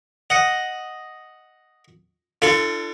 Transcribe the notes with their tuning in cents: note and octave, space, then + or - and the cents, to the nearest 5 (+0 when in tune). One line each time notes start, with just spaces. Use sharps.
D#5 +0 F#5 +0
D4 +25 F4 -35 A4 +10